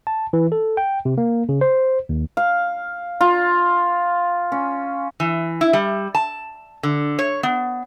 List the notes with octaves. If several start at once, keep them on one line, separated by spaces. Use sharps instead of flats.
A5
E3
A4
G5
C3
A#3
C#3
C5
D#2
F5
F4
C#4
E3
E4
G3
A5
D3
C#5
B3